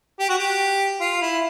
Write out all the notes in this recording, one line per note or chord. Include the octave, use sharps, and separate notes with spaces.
G4
F#4
G4
F4
E4